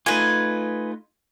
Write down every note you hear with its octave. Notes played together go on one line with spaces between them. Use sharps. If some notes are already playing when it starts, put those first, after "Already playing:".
A3 D#4 F4 B4 G#5